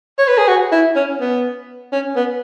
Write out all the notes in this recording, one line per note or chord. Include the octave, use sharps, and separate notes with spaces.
C#5
B4
G#4
F#4
E4
C#4
B3
C#4
B3